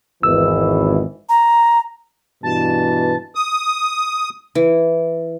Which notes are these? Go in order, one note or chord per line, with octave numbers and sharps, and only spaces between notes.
G#1 E2 E3 E6
A#5
G2 B2 E3 A5
D#6
E3